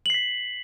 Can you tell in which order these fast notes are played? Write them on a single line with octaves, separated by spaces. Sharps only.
F#7 C7 B6